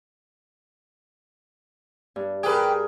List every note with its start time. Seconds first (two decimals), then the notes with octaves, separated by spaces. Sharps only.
2.16 G2
2.43 G4 G#4 A#4 B4